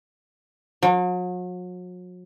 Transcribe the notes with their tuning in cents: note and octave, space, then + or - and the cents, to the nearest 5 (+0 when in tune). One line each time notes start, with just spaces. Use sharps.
F#3 -40